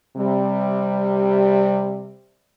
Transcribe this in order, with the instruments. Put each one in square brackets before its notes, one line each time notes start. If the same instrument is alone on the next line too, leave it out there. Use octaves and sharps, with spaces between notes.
[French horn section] C3 G3